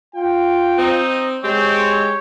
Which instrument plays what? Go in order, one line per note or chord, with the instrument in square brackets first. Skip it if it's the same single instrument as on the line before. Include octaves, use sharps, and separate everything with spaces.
[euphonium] F4 [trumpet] G5
[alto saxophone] C4 [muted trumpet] D#4
[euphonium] G#3 [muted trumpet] C4 [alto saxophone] G4 [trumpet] C#5